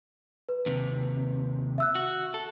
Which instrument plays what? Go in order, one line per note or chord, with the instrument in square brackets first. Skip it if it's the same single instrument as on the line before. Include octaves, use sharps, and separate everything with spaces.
[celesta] B4
[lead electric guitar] D#2 C3
[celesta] E5 E6 F#6
[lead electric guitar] F#4
A4